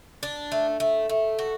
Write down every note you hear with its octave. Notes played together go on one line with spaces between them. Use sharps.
D4
A3
A3
A3
F#4